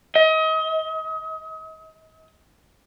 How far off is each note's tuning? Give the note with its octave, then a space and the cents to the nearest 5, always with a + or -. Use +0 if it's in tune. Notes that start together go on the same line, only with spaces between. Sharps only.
D#5 +35